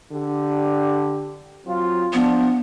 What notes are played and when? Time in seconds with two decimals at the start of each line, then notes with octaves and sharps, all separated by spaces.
0.12 D3 D4 G4
1.65 F#3 C4 F4
2.13 F3 B3 D4